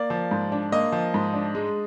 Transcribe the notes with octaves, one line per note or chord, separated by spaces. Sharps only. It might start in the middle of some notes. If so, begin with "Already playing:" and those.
Already playing: A#3 D5
F3
G#2
D4
A#3 D#5
F3
G#2
D4
G#3